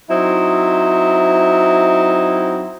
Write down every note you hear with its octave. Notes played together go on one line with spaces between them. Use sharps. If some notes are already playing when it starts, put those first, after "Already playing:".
F#3 C4 D#4 E4